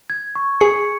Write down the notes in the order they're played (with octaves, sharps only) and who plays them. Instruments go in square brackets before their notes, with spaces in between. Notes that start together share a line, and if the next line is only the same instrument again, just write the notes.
[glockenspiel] G#6
C#6
[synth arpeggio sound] G#4 [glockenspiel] C#7